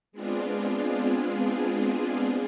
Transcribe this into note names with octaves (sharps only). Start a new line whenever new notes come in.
G#3 B3 C4 D4 F4 G#4